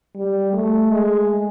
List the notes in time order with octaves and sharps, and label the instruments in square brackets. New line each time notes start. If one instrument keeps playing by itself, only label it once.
[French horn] G3
A3
G#3